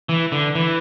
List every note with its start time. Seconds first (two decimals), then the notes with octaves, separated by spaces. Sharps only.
0.09 E3
0.32 D3
0.55 E3